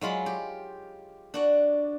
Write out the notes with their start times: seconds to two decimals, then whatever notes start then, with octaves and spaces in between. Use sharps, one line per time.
0.01 F#3 G#3 F4 B5
0.26 G4
1.34 D4 F#4 D5